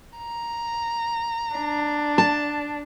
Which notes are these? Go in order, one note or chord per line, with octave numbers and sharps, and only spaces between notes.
A#5
D4
A5